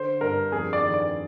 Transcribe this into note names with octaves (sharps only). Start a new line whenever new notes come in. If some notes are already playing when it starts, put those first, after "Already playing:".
Already playing: D3 C5
G2 A#4
F2 G#4
D5
D#3
D5